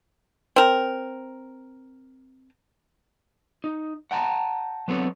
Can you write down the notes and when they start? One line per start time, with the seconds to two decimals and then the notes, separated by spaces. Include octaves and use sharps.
0.56 C4 A#4
3.64 D#4
4.11 F#5 G5 A5 A#5
4.88 F#3 B3 C4 A4 C#5